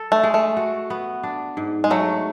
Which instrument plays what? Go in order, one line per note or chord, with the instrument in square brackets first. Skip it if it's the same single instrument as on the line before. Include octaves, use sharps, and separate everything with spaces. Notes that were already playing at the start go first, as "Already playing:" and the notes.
Already playing: [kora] A4
[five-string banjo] A3
[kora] G#3
[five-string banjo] A3
[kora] F#4
B3
D4
G#2
[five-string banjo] G#3
[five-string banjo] F#3 [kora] A3